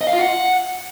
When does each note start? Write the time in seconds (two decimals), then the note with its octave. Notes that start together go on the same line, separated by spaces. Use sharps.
0.01 D#5
0.07 F5
0.13 F4
0.19 F#5